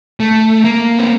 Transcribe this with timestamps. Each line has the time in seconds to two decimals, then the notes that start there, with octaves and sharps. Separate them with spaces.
0.20 A3
0.64 A#3
0.98 C4